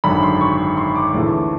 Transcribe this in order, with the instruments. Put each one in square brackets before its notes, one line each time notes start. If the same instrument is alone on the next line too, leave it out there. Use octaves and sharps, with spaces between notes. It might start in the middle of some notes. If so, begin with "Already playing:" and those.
[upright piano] G#1 F#2 D3 B5
C6
C#6
C6
D6
D2 C#3 E3 A3